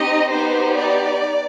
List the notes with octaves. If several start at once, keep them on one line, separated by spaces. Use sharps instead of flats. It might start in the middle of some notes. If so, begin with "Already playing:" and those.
Already playing: C4 D#4 G4 D#5
B3 D#4 G4 C5
D5